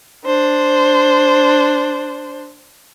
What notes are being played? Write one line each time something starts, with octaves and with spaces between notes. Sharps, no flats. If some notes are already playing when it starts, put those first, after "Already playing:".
D4 C5